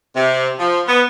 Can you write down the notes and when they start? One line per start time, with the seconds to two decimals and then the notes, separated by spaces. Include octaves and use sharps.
0.16 C3
0.59 F3
0.88 B3